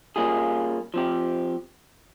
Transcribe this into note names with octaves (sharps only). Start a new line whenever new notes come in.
G3 A#3 C#4 F4 G#4
F3 C4 G4